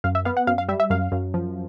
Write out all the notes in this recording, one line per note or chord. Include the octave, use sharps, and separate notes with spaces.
F#2 F5
E5
B3 F5
F#5
F#2 F5
F5
G3 E5
E5
F#2 F5
F#2
F3